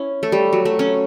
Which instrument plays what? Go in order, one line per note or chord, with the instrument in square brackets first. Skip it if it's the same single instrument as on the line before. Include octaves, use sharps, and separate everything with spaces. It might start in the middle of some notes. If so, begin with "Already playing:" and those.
Already playing: [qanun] C#4 E4
A3
G3
F#3
A3
C#4